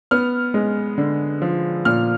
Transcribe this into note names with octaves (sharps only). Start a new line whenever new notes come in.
B3 F6
G#3
D3
F3
A#2 F6